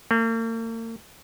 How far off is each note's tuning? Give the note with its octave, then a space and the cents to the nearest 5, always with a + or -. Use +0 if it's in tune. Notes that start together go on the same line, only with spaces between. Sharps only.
A#3 -45